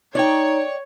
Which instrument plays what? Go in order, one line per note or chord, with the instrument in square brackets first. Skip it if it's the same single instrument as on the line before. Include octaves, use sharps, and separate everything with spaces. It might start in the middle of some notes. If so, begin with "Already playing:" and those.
[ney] D#4 [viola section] C#5 [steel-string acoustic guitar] D5 G5